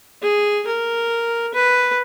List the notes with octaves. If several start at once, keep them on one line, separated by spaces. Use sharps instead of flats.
G#4
A#4
B4